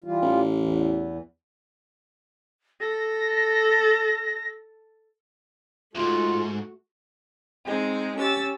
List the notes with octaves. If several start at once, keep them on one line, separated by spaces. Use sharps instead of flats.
E3 G3 F4
A1
E2 E3
A4 A#6
C2 G#2 A3 F4 F#4
G#3 C4 D#4 G#4
C#4 G4 E6 A6